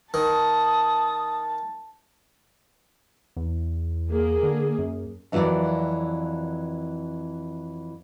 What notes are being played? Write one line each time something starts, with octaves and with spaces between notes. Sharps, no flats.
D#3 A5 D#6
E2
A#3 G#4
D3
F#2
F2 E3 F#3 A#4 D5